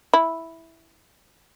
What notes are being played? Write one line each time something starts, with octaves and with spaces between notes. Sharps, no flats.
E4